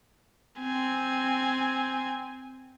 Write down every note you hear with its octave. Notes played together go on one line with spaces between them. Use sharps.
C4 G#5